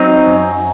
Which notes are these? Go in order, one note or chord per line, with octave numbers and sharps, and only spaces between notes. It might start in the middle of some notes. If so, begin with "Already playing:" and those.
Already playing: F#3 C4 D#4
F#2